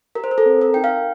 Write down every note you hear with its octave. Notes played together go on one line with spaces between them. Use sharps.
G4 A#4
C5
A#4
A4
C4
A#4
D#4 G5
F5